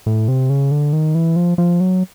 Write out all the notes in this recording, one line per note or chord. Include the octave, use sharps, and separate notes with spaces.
A2
C3
C#3
D3
D#3
E3
F3
F3
F#3